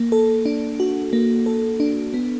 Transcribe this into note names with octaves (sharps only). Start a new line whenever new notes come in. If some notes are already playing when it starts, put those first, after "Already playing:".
Already playing: A#3
A4
D4
F#4
A#3
A4
D4
B3